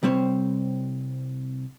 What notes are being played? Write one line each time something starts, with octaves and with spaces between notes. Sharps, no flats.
C2 G3 C4 C5 C#5